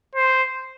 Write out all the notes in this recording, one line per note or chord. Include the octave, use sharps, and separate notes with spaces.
C5